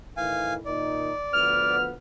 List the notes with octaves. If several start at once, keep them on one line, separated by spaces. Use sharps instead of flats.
A2 D#3 E3 F5 G#5
A#2 D#3 D#4 D5
D2 F3 B3 F6